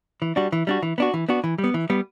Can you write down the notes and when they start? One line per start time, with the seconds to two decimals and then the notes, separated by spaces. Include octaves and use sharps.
0.22 E3
0.36 G3 D4 F#4
0.52 E3
0.67 G3 D4 F#4
0.83 E3
0.98 B3 D4 F#4
1.14 E3
1.29 B3 D4 F#4
1.44 E3
1.58 G3
1.64 B3
1.74 E3
1.90 G3 B3